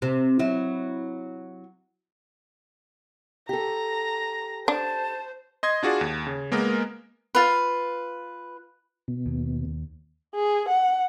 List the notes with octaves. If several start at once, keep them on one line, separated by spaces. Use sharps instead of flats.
C3
F#3 E4
G4 A4 A#5
D4 C5 A5
D#5 C6 G#6
D4 F4 F#4 G#4 D5
D#2
C#3
G#3 A#3 B3 A#4
F4 B4
B2
D#2
G#4
F#5